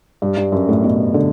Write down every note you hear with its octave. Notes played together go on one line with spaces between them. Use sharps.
G2
G2
F#2
A2
B2
D3